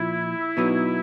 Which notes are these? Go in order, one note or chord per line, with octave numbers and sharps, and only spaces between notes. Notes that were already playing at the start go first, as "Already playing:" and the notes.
Already playing: A#2 F3 E4
B2 F#3 B3 D#4